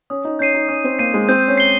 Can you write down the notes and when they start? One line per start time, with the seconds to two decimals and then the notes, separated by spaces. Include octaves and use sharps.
0.10 C#4 D#6
0.25 D#4
0.39 C#4 G6 C7 D#7
0.54 D#4
0.69 C#4 D#6
0.84 C4
0.99 A#3 G6 C7 D#7
1.14 G#3
1.29 C4 G6
1.48 C#4
1.57 C7 G7